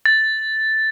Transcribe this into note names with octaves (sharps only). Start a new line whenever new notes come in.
A6